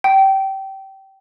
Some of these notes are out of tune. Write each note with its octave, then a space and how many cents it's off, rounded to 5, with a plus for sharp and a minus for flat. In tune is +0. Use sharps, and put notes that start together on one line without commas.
G5 -20